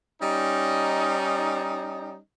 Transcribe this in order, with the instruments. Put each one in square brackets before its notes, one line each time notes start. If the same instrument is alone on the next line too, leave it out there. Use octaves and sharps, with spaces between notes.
[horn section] G3 C#4 D#4